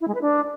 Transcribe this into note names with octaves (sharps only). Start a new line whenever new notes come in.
E4
G#3
B4
D4